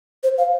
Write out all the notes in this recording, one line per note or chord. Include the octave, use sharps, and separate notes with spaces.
C5
F5